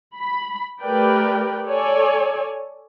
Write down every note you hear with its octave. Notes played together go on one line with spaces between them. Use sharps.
B5
A3 G4 A#4 B4 D5 G5
A4 C#5 D5 G#5